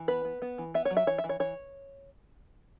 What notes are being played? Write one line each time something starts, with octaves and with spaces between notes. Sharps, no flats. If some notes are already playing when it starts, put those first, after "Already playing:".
Already playing: E3
B3 B4
B3
B3
E3
B3 E5
C#5
F#3
E5
E3 C#5
E5
E3
C#5
E3 C#5